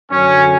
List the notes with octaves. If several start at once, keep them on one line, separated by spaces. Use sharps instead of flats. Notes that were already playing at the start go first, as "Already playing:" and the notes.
F#2 D3 C#4